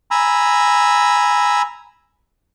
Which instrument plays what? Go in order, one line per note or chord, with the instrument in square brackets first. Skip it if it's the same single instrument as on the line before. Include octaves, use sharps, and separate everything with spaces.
[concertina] G#5 A#5 B5 E6